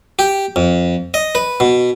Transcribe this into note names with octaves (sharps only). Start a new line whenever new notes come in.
G4
F2
D#5
B4
B2